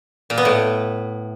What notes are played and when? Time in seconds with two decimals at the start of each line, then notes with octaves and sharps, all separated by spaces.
0.30 A#2
0.38 B3
0.45 A2